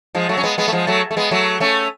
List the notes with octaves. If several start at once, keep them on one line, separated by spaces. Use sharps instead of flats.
F3 G#3
F#3 A3
C#4
G#3 B3
G#3 B3
A3
F3 G#3
F#3 A3
A3
G#3 B3
F#3 A3
A3 C#4